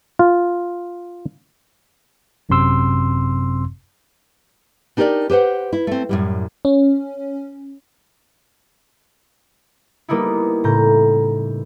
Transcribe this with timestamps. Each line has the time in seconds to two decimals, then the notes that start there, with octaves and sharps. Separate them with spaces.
0.19 F4
2.49 G#1 F#2 C3 C4 C6 E6
4.97 D4 D#4 G4 G#4 A#4 D5
5.30 G4 B4 C5 F#5
5.73 E4
5.87 A3 C4
6.09 F#2 A2 G3
6.65 C#4
10.09 G3 A#3 B3 D#4 E4
10.64 A2 C#3 A#5 G6